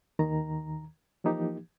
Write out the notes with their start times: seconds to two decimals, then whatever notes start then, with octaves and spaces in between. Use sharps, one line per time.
0.19 D#2 D#3 A#5
1.24 E3 F3 A#3 D#4 G4